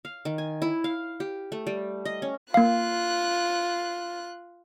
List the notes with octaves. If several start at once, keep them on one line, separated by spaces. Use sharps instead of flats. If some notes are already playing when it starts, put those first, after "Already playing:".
F5
D#3
G#5
E4
F5
G4
A3
G3
D#5
C#4
A#3 F4 F5 F#6